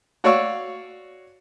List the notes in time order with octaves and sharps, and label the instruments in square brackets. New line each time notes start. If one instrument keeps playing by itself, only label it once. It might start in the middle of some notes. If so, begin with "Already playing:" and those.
[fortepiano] F#4 C#5 D5 F5 C#6 E6